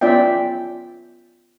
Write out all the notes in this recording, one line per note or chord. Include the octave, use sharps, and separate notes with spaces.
B3 C#4 F4 D5 E5 G5